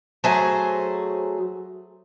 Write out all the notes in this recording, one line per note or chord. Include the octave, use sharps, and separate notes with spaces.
F#3 A3 G#4 C5